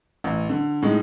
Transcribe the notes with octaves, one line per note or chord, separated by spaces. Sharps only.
A1
D3
A2 G#3 D#4